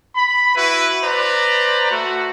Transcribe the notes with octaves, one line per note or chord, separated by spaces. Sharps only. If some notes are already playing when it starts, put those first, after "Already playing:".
B5
E4 F#4 B4
B4 C5 D5 A#5
A3 F#4